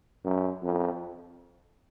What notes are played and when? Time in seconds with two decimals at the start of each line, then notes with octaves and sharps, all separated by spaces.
0.24 F#2
0.62 F2